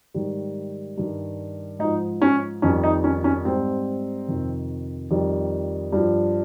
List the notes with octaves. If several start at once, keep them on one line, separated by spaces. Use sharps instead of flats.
G#2 D#3 G3
G2 D#3 G3
G#2 F3 D#4
C#4
F2 D#3 G3 C#4
D#4
C#4
C#4
G#2 G3 C4
F2 C3 D#3
F2 D#3 G3
G2 F3